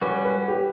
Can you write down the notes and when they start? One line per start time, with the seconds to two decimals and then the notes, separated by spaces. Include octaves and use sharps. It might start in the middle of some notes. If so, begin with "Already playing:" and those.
0.01 G3 C#4 F#4 B4
0.25 B4
0.48 G4